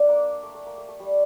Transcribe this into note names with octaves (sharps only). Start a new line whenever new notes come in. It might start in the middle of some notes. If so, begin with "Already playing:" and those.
Already playing: D4 G4
A#3
A3
A3
A#3
A3
A3
G3